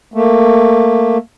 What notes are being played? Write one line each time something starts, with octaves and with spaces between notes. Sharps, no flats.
A3 A#3